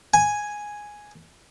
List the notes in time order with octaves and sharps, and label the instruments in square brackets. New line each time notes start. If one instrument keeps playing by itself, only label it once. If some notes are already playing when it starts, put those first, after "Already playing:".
[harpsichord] G#5